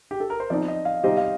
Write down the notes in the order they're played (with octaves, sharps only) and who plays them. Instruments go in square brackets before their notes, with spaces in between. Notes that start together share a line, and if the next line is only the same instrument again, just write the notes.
[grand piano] G4
A4
A#4
C5
[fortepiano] F3 C4 D#4 [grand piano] D5
[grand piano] D#5
F5
[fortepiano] C3 G3 C4 D#4 G4 [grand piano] D#5
[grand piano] F5